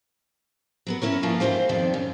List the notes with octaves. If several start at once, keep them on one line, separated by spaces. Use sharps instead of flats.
F#3 B3 A#4
C#4 E4 A#4 C#5
E3 F3 A3 A#3 F4
D#3 E3 G4 C5 F5
F2 B2 D#3 C4 D5
F#2